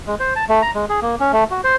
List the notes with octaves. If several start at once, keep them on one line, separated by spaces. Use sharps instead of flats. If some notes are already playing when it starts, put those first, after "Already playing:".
G#3
C5
A5
A3
A#5
G#3
G#4
A#3
C#4
A3
F#4
C5